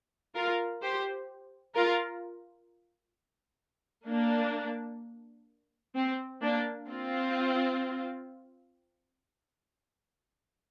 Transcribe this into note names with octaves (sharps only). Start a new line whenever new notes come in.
F4 A#4
G4 C5
F4 A#4
A#3 D4
C4
A#3 D4
C4 F4